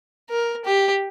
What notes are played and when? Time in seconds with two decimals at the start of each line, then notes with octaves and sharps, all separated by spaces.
0.30 A#4
0.65 G4